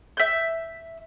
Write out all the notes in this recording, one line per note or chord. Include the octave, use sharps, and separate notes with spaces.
E5 G6